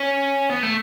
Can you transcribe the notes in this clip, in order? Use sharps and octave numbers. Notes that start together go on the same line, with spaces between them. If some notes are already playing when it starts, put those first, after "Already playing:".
Already playing: C#4
B3
A3